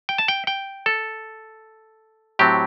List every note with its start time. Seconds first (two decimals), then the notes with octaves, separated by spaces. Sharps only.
0.09 G5
0.18 A5
0.28 G5
0.47 G5
0.86 A4
2.39 A2 F#3 C4 G4